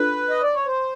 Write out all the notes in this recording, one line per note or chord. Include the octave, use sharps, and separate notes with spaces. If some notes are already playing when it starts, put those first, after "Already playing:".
Already playing: D4 F4 A4 B4
D#5
D5
C#5
C5